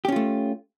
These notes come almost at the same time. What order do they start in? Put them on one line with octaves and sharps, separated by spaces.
G4 C#4 F4 A3